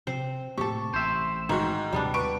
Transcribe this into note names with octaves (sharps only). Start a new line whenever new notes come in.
C3 C4 C5
A2 C3 A#3 G4 A4 C#6
A1 C5 E5
G#2 D#3 F#4
D#2 C3 G3 G#3 B3 D4
B4 C#6 D7